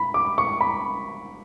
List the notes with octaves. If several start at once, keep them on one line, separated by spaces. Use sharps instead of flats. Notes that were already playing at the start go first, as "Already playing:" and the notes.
Already playing: B5
D6
C#6
B5